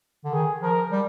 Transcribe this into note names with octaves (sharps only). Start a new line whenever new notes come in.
D3
D#3 G#4
F3 A#4
G3